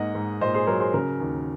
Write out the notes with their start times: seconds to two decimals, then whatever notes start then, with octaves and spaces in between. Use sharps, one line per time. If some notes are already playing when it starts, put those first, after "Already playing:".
Already playing: G#2 A#3 D#5 F#5
0.15 G#2
0.41 A#2 C5 D#5
0.54 G#4 C5
0.67 F#3 A#4 C#5
0.80 G#4 C5
0.94 C#3 A#4
1.20 D#2